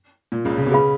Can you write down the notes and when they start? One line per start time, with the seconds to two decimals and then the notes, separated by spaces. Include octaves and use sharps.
0.32 A#2
0.45 C#2 C#3
0.58 C#3
0.66 B2
0.72 C#3 G#4 B4 F5 B5